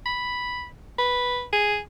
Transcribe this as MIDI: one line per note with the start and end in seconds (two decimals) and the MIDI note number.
0.06 0.66 83
0.98 1.44 71
1.53 1.78 68